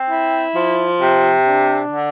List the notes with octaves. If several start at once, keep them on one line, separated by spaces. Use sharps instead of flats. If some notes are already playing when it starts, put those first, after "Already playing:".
Already playing: C4
E4
F3
C3
D4
D3